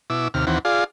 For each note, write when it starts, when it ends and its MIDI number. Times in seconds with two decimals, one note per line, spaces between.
0.10 0.28 47
0.10 0.28 64
0.10 0.28 86
0.10 0.28 88
0.34 0.45 39
0.34 0.45 48
0.34 0.45 89
0.47 0.59 39
0.47 0.59 52
0.47 0.59 60
0.47 0.59 78
0.65 0.84 65
0.65 0.84 68
0.65 0.84 74
0.65 0.84 77